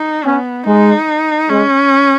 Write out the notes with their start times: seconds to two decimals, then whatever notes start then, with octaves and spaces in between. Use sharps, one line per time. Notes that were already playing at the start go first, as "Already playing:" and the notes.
Already playing: D#4
0.25 B3 C#4
0.66 G#3 D#4
1.49 G#3 C#4